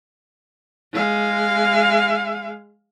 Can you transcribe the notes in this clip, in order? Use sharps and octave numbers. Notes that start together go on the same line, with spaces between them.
G#3 F5